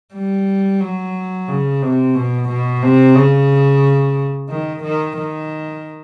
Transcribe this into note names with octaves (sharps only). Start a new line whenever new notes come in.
G3
F#3
C#3
C3
B2
B2
C3
C#3
D#3
D#3
D#3